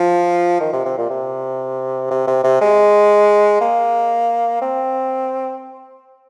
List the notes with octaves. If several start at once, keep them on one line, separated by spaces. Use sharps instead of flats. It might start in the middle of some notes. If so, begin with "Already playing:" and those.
Already playing: F3
D#3
C3
C3
A#2
C3
C3
C3
C3
G#3
A#3
C4